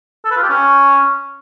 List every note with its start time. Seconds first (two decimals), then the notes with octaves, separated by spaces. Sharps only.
0.25 A4
0.31 B4
0.37 F4
0.43 G4
0.49 C#4